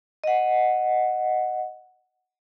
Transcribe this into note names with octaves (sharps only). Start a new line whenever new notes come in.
D#5 F#5